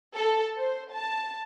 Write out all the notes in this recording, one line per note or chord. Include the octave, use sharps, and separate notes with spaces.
A4
C5
A5